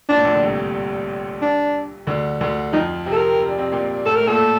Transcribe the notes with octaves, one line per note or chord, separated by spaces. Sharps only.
A#2 D4
A2
A#1 A#2
D3
C2 C3
D4
D2 D3
D2 D3
F2 F3 D#4
C3 C4
A4
A#4
C4
D4
C3 C4
A#2 A#3
A2 A3 A4
A3 A#4
A#2 A#3 A4